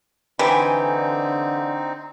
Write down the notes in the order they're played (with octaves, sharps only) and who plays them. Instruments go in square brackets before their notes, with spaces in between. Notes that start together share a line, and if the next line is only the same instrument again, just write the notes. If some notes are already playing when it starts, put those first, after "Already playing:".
[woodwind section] D3 [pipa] E3 [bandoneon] C4 D#4 [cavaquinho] G4 G#5 C6